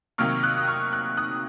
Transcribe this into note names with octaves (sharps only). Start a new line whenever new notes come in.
C3 D#3 F#3 A#3 C#6 F6
D#6 F#6
D#6
C#6 F6
F#6
D#6 F#6